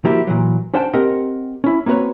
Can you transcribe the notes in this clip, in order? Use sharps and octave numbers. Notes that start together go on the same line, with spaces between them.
F3 A#3 E4 F#4 G4
A#2 E3 F#3
C#4 D4 C5 F#5 G5 A5
C4 G4 A#4 D#5 F#5
C#4 E4
A#3 C4 F#4 B4 C#5